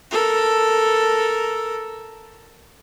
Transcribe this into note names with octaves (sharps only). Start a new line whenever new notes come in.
A4 A#4